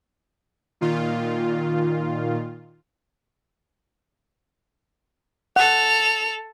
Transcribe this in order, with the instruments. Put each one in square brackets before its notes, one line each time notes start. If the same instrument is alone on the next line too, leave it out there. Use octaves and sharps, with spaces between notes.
[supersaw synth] A#2 D#3 F4
[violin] A4 F7 [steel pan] F#5